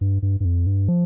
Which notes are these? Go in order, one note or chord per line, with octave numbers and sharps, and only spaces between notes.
G2
G2
G2
F2
G2
F3